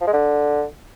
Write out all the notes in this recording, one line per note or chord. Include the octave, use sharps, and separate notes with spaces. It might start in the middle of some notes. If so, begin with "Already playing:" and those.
F3
G#3
D3